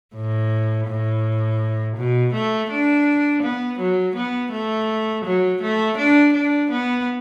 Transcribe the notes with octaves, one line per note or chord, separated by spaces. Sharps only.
A2
A2
B2
A3
D4
B3
F#3
B3
A3
F#3
A3
D4
D4
B3